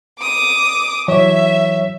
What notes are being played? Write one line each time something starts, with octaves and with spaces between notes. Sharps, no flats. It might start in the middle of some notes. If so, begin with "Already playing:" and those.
D6 D#6
E3 F#3 C#5 E5